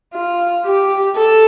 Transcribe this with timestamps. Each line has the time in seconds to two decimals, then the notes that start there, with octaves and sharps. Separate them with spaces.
0.14 F4
0.65 G4
1.16 A4